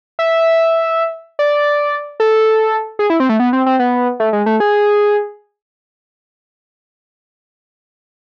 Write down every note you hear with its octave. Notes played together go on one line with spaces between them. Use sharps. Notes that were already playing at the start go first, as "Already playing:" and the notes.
E5
D5
A4
G#4
E4
C4
A3
B3
C4
C4
B3
A3
G#3
A3
G#4